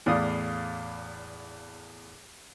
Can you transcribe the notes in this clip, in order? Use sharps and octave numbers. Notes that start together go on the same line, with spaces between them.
E2 A2 D5 F5 D#6